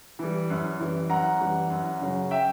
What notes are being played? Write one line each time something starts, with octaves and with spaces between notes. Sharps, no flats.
E3 G3
F#2
E3 G3
F#2 F#5 A#5
E3 G3
F#2
C#3 F#3
E5 G5